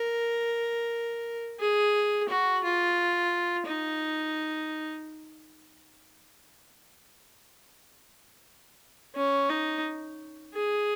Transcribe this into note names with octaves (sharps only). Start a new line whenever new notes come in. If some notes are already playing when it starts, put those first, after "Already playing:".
Already playing: A#4
G#4
F#4
F4
D#4
C#4
D#4
G#4